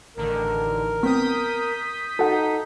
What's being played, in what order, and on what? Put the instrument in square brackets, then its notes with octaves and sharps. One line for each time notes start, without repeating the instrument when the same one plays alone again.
[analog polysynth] A1 D3 D#3 [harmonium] A#4
[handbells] B3 C4 [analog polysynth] D#6 G6 B6
[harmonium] D#4 [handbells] F#4 F#5 [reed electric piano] A4